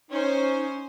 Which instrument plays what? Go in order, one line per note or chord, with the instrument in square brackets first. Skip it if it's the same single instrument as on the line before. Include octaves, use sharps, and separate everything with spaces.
[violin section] C#4 C5 [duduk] D#4